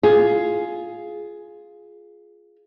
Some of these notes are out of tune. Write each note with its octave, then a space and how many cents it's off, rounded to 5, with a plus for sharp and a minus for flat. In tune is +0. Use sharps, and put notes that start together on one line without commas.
F4 +0 G#4 +10